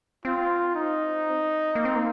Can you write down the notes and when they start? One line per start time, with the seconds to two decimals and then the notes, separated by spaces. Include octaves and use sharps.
0.25 C4 F4
0.75 D#4
1.75 A#3
1.85 C4
1.96 A#3